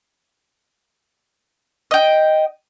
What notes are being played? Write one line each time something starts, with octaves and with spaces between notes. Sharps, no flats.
D#5 G5